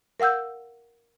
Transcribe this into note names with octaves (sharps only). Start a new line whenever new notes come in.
A#4 F5 F#5 E6 G6